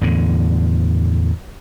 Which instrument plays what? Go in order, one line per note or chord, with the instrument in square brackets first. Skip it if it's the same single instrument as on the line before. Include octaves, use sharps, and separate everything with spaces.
[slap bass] E2 A2 D3